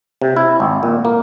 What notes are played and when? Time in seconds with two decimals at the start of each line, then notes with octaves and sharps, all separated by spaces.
0.22 C3
0.36 E4
0.60 G#1
0.83 A#2
1.05 A#3